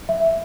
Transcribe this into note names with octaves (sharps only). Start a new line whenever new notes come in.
E5